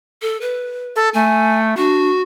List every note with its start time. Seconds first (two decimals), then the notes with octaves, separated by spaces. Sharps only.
0.22 A4
0.41 B4
0.96 A4
1.14 A3 G#5
1.77 D4 F#4